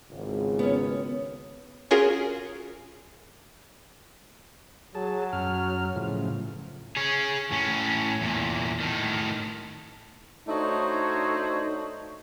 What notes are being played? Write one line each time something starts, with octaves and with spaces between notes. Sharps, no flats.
G#1 C#2
B3 C#4
C#4 F4 F#4 G#4 A#4
F#3 G#4 A5
F#2 F6
A2 C#3 F3
G#4 C#5
A2 C#4
E2 A#2
A2 D#3
A3 D4 D#4 F#4 C5 C#5